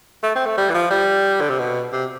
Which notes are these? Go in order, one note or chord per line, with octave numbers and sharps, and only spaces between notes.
A3
C4
A3
G3
E3
F3
G3
D3
C3
B2
C3